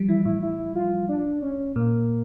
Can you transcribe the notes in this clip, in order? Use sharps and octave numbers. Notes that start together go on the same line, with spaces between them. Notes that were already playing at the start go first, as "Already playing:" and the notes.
Already playing: F3 G3
E3 E4
A2 E4
E4
F4
D4
C#4
A#2 A#3